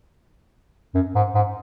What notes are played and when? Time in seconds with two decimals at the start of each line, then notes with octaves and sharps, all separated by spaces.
0.95 F#2
1.15 G#2
1.35 G#2